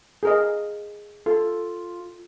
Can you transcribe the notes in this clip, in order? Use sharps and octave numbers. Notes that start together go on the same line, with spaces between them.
G#4 A#4 D#5
F4 A4